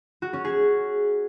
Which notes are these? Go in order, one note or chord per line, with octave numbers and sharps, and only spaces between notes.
F#4
C#4
G#4